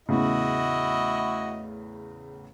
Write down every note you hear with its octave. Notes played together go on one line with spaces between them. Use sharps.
E2 A2 C#3 E4 F#4 D#5